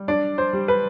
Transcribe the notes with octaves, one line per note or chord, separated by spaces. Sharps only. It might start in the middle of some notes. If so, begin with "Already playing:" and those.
Already playing: G3
D4 D5
C5
G3
B4